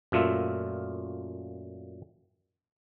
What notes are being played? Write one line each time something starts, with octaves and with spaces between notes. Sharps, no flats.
F#2 A#2 A3 F4 E5